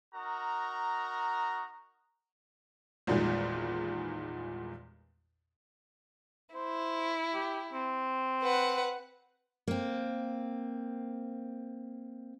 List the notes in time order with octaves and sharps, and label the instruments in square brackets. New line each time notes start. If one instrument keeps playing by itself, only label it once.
[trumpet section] D#4 F#4 A#4 A#5
[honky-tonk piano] G#1 E2 A#2 D#3 G3 G#3
[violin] E4 [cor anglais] C5
[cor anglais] G4
C4
[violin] B4 F#5
[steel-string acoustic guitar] A#3 C4